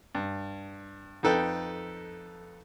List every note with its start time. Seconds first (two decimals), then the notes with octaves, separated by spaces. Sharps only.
0.15 G2
1.23 F2 D#4 A4 B4 G5